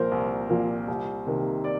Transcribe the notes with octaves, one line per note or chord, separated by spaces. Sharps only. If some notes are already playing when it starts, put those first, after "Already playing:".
Already playing: C2 A#2 F3 A#3 A#4 C5
C2
A#2 F3 A#3
C2
C3 D#3 A#3
D5